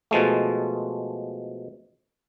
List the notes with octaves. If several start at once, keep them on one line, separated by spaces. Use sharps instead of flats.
B2 F3 G#3 A3